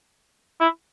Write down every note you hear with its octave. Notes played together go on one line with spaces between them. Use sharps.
E4